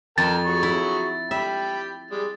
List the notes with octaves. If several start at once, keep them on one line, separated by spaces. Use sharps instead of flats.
F2 A#4 G5 A5 A6
F#3 G#4 C#6
E4
G4 E5 G5 B5
G3 G#3